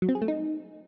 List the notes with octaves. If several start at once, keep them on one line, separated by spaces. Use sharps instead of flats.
F#3
C4
G#4
A3
D#4